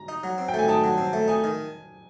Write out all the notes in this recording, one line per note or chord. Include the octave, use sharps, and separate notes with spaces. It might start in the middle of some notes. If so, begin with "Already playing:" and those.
Already playing: A#5
D#4
F#3
C4
G5
A3 G#5
D#4 A5
F#3
C4
A3
D#4 G#5
D#3